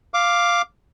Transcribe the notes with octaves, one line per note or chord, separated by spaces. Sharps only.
F5 D6